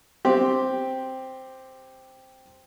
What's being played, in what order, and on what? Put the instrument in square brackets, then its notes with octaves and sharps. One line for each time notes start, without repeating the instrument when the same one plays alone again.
[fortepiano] C4 G4